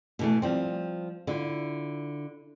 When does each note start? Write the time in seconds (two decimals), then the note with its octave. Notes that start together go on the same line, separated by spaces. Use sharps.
0.19 B2 E3 A3
0.42 F3 G3 C4
1.27 D3 E4 F4